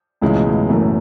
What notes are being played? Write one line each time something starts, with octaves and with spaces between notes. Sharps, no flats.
C#2 A2 C#3 E3 G#3
B2
A2
F#1 F#2 E3 A3